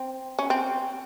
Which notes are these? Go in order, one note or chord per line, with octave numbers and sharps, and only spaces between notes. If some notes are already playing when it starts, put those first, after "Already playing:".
Already playing: C4
C#4
C4